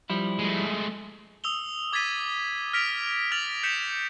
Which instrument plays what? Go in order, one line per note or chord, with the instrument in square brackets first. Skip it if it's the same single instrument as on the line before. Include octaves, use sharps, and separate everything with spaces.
[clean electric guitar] F3 G3 E4
[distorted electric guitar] G#3 A3
[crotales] D#6 E6 F7 G7
D6 G#6 A6 B6 D#7
F6 A#6 B6 D7 F7
F6 A6 B6 F7 F#7
G6 B6 C#7 E7